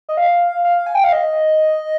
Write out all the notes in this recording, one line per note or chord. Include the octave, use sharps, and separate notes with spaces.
D#5
F5
F5
G#5
G5
F5
D#5